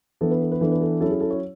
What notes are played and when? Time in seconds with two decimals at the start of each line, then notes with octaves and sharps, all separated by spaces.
0.21 E3 B3 D4 A4
0.31 B4
0.41 A4
0.52 B4
0.61 E3 B3 D4 A4
0.72 B4
0.81 A4
1.01 F#3 C#4 E4 A4
1.10 G#4
1.21 A4
1.30 C#5